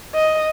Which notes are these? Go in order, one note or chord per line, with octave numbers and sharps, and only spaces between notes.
D#5